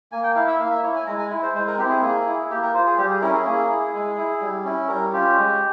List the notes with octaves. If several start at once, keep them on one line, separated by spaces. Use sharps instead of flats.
A#3 G#5
G5
E4 F5
E5
A#3 F5
E5
E4 C#5
G#5
G#3 A#5
G#5
E4
C5
G#3 C5
A#4
C4 E4 G4
G#4
A#3 G#4
E4
A#3 G4
A#4
F4 C5
G#4
G3 G4
G#4
C#4 E4 A#4
G#4
A#3 G#4
E4
G#3
E4
G3
C#4 E4
G3 A#4
C#4 F4 G4
G#3